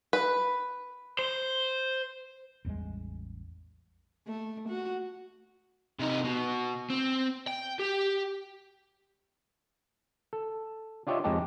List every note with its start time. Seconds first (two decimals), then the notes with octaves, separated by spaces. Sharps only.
0.13 B4
1.19 C5
2.65 A1 E2 G3 G#3
4.27 A3
4.69 F#4
5.99 C3 D#4
6.24 B2
6.90 C4
7.47 G5
7.79 G4
10.33 A4
11.07 D4 F4 G4 C#5 D#5 E5
11.24 F2 G#3 C4 D#4 G4 A5